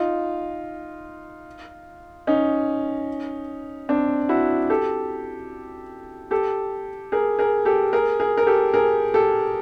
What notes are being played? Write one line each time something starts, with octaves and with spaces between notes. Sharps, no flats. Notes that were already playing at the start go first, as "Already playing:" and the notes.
Already playing: D#4 F4
C#4 D#4
C4 D4
E4 F#4
G4 A4
G4 A4
G#4 A#4
G#4 A#4
G4 A4
G#4 A#4
G#4 A#4
A#4
G4 A4
G#4 A#4
G4 A4